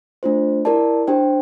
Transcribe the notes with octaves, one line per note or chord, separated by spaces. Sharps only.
A3 D4 F4 C5
E4 G4 A#4 D5 A5
D4 G4 C5 G5